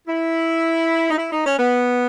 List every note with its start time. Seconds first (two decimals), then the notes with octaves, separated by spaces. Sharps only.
0.07 E4
1.11 D#4
1.18 E4
1.32 D#4
1.46 C#4
1.59 B3